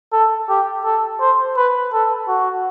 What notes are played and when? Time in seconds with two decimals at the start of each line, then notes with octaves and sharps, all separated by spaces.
0.12 A4
0.49 G4
0.84 A4
1.20 C5
1.57 B4
1.93 A4
2.28 F#4